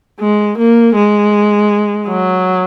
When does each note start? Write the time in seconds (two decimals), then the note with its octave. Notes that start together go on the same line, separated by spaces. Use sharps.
0.20 G#3
0.58 A#3
0.95 G#3
2.07 F#3